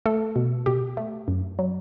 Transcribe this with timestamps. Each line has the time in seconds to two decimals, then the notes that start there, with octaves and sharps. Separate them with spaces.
0.06 A3 A4
0.36 B2
0.66 B2 G4
0.97 A3
1.28 F#2
1.59 F#3